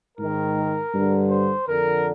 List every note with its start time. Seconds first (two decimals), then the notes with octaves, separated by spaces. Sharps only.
0.18 G#2 D#3 A#4
0.93 G2 D3
1.30 C5
1.68 F2 D3 A#4